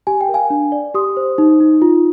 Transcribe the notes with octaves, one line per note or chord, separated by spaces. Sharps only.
G4 G#5
G5
A#4
F5 G#5
D4
D5
G4 C6 D#6
C5
D#4
D#4
F4